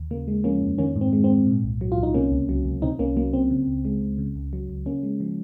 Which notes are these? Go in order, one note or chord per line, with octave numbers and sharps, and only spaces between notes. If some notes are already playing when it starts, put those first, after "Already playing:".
Already playing: D#2
C#3 A#3
G#3
F3 A#3 C#4
F2
D#3 A#3 C#4
G#2
C4
G#3
C4
G#2
A#2
C2
F#3
F4
C2
D#4
C3 A#3 C#4
C#2
F#3
C#2
C3 C4 D#4
C2 A#3 C#4
F#3 A#3
C2 C4
C#3
C#2
G#3
C#2
C#3
C#2
F#3
C#2
C#3 A#3 C#4
G#3
F3